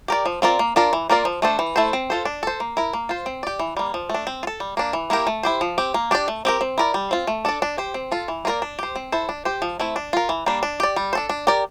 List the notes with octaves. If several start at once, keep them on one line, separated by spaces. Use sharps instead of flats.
G4 A#4 D5
F3
C4 F4 A#4 D5
A#3
D4 F4 A#4 D5
E3
A#3 F4 A#4 D5
F3
A3 D4 A4 C5
E3
A3 E4 A4 C5
C4
F4 A4 C5
D4
A4 C5
A#3
E4 A#4
A#3
F4 C5
C4
G4 D5
E3
G3 A#3
F3
A3 D4
C4
F4
A4
G3
A#3 D4
E3
A#3 E4 G4 A#4
A3
E4 G4 C5
F3
C4 G4
A#3
D4 G4 D5
A3
C4 G4 A#4
C4
E4 A#4 D5
G3
C4 F4
A3
D4 A4 D5
D4
G4 C5
C4
F4 A4
E3
A#3 F4 A#4 D5
D4
G4 C5
C4
E4 A4 C5
D4
G4 C5
F3
A3 C4 E4
D4
F4 A#4
E3
G3 A#3 D4
D4
G4 D5
G3
D4 A4 C5
D4
G4 A#4 D5